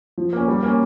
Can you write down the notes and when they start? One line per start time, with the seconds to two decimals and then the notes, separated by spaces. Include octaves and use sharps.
0.18 F3
0.33 A#3 C#4
0.48 G3
0.63 A#3 C#4